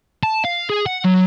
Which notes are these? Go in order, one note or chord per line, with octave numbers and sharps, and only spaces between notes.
A5
F5
G#4
F#5
F#3